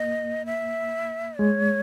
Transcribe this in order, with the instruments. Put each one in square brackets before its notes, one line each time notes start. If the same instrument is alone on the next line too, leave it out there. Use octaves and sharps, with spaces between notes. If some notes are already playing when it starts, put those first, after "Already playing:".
Already playing: [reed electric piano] A#3 [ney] D#5
[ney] E5
[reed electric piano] G#3 [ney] C#5